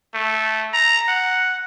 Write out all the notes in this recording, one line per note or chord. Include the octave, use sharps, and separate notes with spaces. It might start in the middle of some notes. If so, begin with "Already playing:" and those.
A3
A#5
F#5